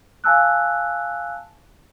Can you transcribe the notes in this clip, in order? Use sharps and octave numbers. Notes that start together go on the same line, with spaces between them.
F5 G#5 A5 E6 F#6